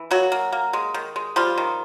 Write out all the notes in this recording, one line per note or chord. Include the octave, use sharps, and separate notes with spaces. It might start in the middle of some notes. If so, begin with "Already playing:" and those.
Already playing: E3
F#3 A#3 F#4
A#3
A#3
G#3
D#3
G#3
F3 G3 F4
D#3